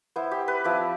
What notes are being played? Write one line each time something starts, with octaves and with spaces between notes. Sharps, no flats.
B3 E4 C5
G4
B4
F3 C4 E4 D5